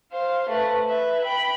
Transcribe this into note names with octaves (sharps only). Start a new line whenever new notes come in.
C5 F5
A3 B4
B4 E5
G5 B5